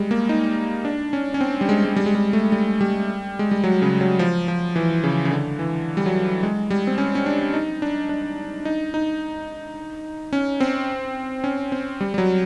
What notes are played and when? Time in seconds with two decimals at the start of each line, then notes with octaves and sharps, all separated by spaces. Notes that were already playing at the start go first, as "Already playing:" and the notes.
Already playing: G3 G#3
0.11 A#3
0.29 D#4
0.85 D4
1.13 C#4
1.34 C#4
1.41 C4
1.61 G3
1.69 G#3
1.85 G#3
1.96 G3
2.06 G#3
2.15 G3
2.33 A3
2.52 G3
2.81 G3
3.39 G#3
3.51 G3
3.64 F#3
3.82 C#3
4.01 F#3
4.19 F3
4.48 F3
4.76 E3
5.04 C#3
5.25 C#3
5.31 D3
5.59 E3
5.97 G3
6.06 F#3
6.43 G#3
6.70 G3
6.87 C4
6.98 C#4
7.15 C#4
7.26 D4
7.54 D#4
7.82 D4
8.09 D4
8.65 D#4
8.94 D#4
10.33 C#4
10.60 C4
11.44 C#4
11.72 C4
12.01 G3
12.14 G3
12.18 F#3